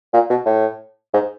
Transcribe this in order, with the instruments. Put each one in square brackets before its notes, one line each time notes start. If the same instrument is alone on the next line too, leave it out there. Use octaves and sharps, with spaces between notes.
[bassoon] A#2
B2
A2
G#2